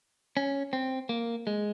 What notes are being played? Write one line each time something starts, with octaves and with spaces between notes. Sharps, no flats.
C#4
C4
A#3
G#3